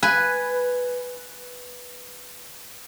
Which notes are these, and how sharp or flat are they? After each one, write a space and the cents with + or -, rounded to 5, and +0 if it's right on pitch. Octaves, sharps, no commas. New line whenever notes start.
B4 +0 G#5 +0